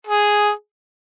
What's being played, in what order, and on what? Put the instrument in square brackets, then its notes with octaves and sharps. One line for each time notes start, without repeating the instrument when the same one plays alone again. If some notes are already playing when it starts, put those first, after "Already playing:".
[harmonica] G#4